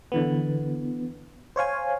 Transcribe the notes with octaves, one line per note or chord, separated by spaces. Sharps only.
D3 E3 B3
C5 C#5 F5 G#5